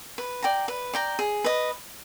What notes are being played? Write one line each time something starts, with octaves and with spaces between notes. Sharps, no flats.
B4
D5 G5 A#5
B4
D5 G5 A#5
G#4
B4 D#5